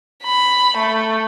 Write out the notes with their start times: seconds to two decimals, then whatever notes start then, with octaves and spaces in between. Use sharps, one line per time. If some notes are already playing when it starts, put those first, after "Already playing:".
0.23 B5
0.77 A3